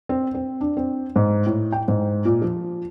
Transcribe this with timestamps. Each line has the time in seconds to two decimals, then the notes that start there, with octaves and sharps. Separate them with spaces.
0.09 C4
0.35 C4
0.61 D4
0.77 C4
1.16 G#2
1.46 A2
1.72 G5
1.88 G#2
2.25 A#2
2.42 F3